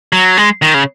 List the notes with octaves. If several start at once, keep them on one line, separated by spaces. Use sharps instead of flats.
F#3
G#3
D#3
C#3